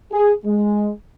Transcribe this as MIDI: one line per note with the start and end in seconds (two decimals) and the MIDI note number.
0.12 0.32 68
0.45 0.89 56